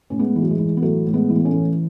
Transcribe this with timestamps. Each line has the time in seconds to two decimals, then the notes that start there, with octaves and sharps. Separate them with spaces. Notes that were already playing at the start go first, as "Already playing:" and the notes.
0.10 A2 C#4
0.19 G#3 B3
0.36 E3
0.42 F#3
0.50 G#3
0.59 E3
0.77 B3
0.82 A2 F#3 A3
1.07 A2
1.14 G#3 B3
1.30 E3
1.35 B3
1.45 A3 C#4
1.53 E3